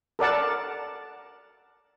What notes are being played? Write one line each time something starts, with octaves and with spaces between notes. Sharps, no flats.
A4 A#4 D5 F#5 A5